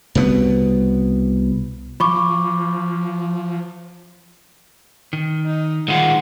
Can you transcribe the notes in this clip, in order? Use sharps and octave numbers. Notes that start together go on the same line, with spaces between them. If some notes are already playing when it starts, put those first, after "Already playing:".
C2 B2 D3 B3
F3 B5 C#6 D6
D#3
D#4
D#3 G#3 F4 F#5